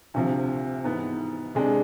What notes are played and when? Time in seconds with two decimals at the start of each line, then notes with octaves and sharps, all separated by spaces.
0.14 D2 C3 F3
0.84 G#2 E3 B3
1.55 C3 G#3 D4